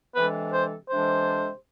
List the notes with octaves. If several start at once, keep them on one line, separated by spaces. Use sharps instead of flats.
C3 E3 G#3 D4 A4 B4
C5
C3 E3 G#3 D4 A4 C5